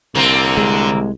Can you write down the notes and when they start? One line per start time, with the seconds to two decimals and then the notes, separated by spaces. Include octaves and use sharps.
0.15 C2 D3 A#3 C4
0.57 G#3